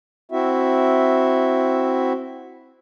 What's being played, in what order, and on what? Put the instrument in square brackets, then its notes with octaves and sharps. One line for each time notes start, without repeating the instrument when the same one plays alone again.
[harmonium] C4 E4 F#4 E5